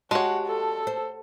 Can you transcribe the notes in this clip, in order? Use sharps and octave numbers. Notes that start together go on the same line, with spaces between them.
G#3 F#4 G4 C#5 F5 F#5 A5
A4
C5